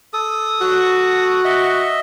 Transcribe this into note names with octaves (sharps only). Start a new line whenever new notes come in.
A4 D#6
F#4
D#5 E5